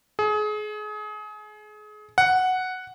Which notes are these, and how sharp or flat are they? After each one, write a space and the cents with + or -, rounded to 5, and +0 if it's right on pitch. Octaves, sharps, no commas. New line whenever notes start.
G#4 +30
F#5 +0